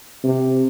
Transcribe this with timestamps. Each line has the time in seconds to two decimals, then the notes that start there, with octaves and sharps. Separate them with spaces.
0.24 C3